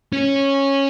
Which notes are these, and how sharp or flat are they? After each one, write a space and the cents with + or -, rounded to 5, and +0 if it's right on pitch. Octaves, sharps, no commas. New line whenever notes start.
C#4 -10